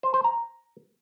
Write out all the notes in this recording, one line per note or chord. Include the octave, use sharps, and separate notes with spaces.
C5
C5
A#5